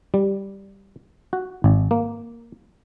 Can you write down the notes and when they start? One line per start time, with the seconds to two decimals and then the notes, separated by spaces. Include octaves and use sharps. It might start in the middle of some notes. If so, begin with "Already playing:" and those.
0.14 G3
1.33 F#4
1.64 G#1
1.91 A#3